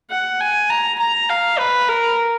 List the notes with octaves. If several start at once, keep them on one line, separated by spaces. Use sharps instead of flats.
F#5
G#5
A#5
A#5
F5
B4
A#4